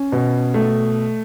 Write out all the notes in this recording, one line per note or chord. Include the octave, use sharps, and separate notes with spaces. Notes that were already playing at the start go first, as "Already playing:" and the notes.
Already playing: C#4
B2
A3